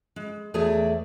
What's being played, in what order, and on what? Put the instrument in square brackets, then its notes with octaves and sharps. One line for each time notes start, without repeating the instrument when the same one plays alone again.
[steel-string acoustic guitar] G#3
E2 A3 G#4 C#5 D5 E5